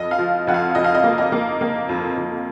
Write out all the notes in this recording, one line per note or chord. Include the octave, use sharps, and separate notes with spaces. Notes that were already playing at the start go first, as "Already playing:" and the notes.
Already playing: F2 D#5
F5
F3
F2 F#5
F5
F2 D#5
F5
D#5
A#3
D#5
A#3
A#3
F2
F2